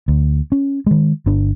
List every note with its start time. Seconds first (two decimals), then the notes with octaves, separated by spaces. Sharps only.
0.08 D2
0.52 C#4
0.86 D#3 G#3
1.26 G1 D4